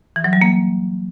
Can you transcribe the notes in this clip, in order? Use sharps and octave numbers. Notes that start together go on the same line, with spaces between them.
E3
F#3
G3
A#3